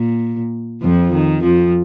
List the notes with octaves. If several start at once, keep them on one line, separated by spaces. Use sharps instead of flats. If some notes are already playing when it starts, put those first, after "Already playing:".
Already playing: A#2
F2 F3
D#3
F2 F3